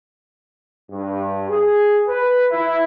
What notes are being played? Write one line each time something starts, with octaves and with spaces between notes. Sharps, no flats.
G2
G#4
B4
E4